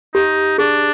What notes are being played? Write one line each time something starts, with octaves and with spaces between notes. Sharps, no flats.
D#4 G4
D4 G#4